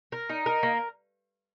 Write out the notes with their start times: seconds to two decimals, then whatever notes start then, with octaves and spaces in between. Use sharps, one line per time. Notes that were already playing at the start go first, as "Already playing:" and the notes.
0.12 A#4
0.29 D#4
0.46 A#4
0.63 A#3